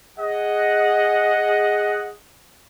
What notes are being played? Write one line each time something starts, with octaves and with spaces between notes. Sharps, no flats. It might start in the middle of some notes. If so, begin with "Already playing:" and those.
G#4 D#5 F#5